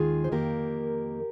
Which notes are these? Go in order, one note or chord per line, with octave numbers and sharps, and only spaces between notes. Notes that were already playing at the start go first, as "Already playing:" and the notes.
Already playing: D#2 D#3 G#3 F4 G#4
C5
F2 D#3 A#3 G4 A#4